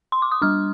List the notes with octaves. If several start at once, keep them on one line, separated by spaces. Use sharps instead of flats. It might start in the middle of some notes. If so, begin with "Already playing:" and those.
C6
D6
D#6
G3 D4 F6